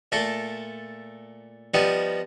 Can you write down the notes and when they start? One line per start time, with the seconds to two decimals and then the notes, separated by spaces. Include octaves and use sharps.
0.12 A#2 A3 A4
1.74 F3 G3 B3 D#4